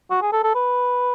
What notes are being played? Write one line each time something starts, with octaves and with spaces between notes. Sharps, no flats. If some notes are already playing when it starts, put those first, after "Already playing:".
F#4
G#4
A4
A4
B4